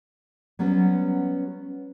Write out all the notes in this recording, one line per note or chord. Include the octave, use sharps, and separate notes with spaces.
F#3 G3 B3 C#4